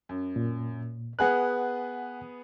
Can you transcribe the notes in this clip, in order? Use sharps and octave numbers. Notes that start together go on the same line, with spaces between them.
F#2
A#2
B3 G#4 B4 F#5 G#5 F#6